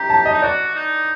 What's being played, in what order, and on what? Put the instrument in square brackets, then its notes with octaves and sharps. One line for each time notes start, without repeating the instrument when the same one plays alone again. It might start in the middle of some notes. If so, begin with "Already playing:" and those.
Already playing: [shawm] G4 [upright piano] A#5
[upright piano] A5
D#5
[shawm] D#4
[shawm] F#4 [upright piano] D5
[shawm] D#4